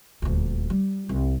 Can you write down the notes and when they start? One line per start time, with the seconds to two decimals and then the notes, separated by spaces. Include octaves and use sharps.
0.22 D#1 D2
0.70 G3
1.09 C2